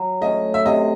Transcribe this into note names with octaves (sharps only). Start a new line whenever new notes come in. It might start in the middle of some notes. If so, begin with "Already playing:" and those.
Already playing: F#3
A3 C#4 D#5
E5
C3 D#5